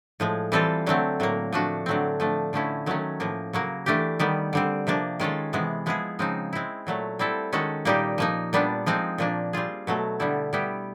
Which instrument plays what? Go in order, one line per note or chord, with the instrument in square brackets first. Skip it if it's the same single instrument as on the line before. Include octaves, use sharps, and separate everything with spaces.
[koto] A2 F3 G#3
E3 G3 C4 F4 A4
D3 F#3 A3 C4
A2 F#3 A#3
F3 A3 D4 F#4
D3 F#3 A3 C4
F3 A3 D4
D3 F3 A3 C#4 E4
D#3 F#3 A3 C#4
A2 F3 A#3
C#3 F#3 A#3
E3 A3 D4 G4
D#3 G3 B3
D3 G3 C4
C3 F3 A#3 D4
D#3 G#3 C#4 F4 A4
C3 E3 G#3 B3
F3 G#3 B3 E4 G#4
C#3 F3 G#3 C4 D#4
G#3 C4 E4
A#2 F#3 A3
G3 C4 E4 A4
D#3 G#3 C#4 F#4 A4
A#2 G3 A#3 D#4 G4
F3 A#3 D#4
A#2 G3 B3 D4
F3 G#3 C4 D#4
A#2 F3 A#3 D4
G3 C4 F4 G#4
B2 F#3 A3
D3 G3 B3 E4
G3 B3 E4 G4